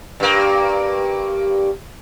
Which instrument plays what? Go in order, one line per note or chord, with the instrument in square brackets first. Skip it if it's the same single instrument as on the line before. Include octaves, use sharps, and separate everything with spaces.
[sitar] G2 A#3